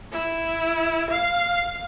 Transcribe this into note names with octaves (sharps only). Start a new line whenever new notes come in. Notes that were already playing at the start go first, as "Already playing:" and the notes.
E4
F5